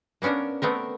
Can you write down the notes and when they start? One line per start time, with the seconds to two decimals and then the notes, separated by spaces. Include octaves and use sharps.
0.22 A#3 B3 C#4 D4 A#4
0.62 A3 B3 C4 A#4